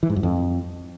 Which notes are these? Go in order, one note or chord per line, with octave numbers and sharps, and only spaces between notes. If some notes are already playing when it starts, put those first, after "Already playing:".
E3
G#2
F#2
F2